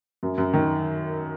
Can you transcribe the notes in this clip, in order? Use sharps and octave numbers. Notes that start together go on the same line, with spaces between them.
F#2
F#2
D#3